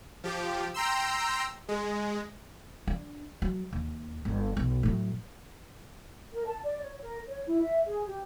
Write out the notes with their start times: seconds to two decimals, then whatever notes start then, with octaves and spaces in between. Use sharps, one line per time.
0.24 F3 G4
0.74 G5 A#5 C6 E6
1.69 G#3
2.87 D4
3.42 F#3
3.73 D#2
4.25 G1
4.57 B1
4.83 A2 F#3
6.34 A#4
6.47 A5
6.63 D5
6.82 C#5
7.01 A#4
7.28 C#5
7.47 E4
7.61 E5
7.86 G#4
8.06 G4